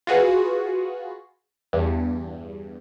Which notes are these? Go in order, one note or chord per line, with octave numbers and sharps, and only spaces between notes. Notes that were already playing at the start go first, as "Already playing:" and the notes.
F4 F#4 G#4 B4
E2 G2